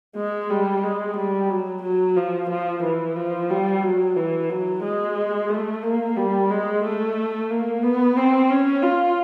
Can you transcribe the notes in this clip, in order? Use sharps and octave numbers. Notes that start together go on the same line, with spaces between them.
G#3
G3
G#3
G3
F#3
F#3
F3
F3
E3
F3
G3
F#3
E3
F#3
G#3
A3
A#3
G3
G#3
A3
A#3
B3
C4
C#4
F4